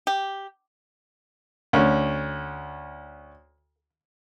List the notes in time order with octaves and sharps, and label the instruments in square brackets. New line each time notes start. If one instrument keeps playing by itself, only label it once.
[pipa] G4
[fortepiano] D2 C#4